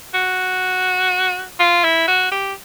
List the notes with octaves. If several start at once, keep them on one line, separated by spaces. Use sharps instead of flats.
F#4
F4
E4
F#4
G4